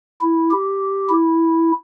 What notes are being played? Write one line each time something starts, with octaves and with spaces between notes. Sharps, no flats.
E4
G4
E4